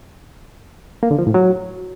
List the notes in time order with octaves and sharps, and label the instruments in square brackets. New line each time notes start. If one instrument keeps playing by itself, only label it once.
[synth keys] A#3
D3
F3
A2
F#3